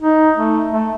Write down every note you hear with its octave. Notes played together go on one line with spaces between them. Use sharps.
D#4
A3
A3